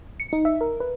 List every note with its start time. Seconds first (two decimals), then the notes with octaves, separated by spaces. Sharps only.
0.20 C#7
0.33 D#4
0.45 E5
0.61 A#4
0.80 B4